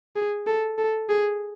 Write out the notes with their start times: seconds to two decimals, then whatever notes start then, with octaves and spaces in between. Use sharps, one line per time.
0.16 G#4
0.47 A4
0.78 A4
1.09 G#4